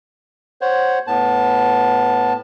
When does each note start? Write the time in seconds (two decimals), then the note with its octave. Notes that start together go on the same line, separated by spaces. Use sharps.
0.61 C5 C#5 F#5
1.07 A2 B3 A5